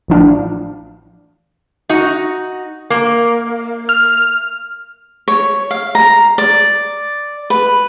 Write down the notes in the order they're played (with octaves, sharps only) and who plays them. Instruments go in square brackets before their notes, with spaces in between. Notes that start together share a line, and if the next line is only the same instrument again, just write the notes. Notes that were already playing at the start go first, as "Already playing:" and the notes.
[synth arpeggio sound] A1 F3 D4 F5
[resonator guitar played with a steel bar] D#4 F#4
A#3
[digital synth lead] F6
[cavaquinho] C#5
F5
A#5
D5
B4